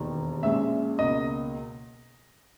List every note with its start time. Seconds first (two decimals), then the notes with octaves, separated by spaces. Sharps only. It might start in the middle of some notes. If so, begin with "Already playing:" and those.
Already playing: E1 D#2 D#3
0.43 A#1 A#2 G#3 C#4 E5
0.99 C#2 B2 A#3 D#5